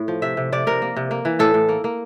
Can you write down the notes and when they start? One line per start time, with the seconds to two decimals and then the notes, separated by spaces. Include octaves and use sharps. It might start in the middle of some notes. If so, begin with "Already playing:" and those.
Already playing: A2
0.08 F3
0.22 C3 E5
0.37 C3
0.52 C3 D5
0.67 C3 A#4
0.82 A#3
0.97 C3
1.11 A#3
1.25 E3
1.39 A2 A4
1.54 A2
1.69 A#3
1.84 A#3